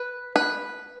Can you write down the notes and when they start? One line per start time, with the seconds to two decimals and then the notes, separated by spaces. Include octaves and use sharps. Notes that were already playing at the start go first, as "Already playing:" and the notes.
Already playing: B4
0.36 B4